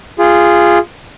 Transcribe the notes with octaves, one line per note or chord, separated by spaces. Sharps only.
F4 G#4